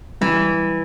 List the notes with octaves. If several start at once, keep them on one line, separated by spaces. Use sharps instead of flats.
E3 G3